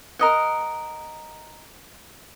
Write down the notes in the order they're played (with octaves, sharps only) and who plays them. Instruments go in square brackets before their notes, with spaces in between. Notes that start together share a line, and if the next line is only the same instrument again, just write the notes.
[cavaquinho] A#4 D#5 F#5